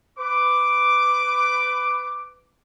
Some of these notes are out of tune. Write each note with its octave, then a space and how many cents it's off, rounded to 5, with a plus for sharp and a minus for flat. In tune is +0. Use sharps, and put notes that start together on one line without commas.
B4 +20 D6 +0